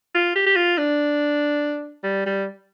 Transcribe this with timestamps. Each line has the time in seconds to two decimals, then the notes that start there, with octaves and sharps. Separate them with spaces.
0.14 F4
0.36 G4
0.46 G4
0.56 F4
0.78 D4
2.04 G3
2.26 G3